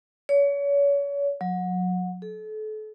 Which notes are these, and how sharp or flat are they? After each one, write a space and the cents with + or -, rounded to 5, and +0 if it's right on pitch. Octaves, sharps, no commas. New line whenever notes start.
C#5 +35
F#3 -25
A4 -35